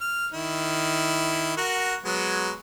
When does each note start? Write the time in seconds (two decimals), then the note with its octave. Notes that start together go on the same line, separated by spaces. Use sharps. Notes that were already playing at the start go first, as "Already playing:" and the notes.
0.01 F6
0.33 D#3 E4
1.57 F#4 A#4 F#5
2.04 F#3 G#3 B3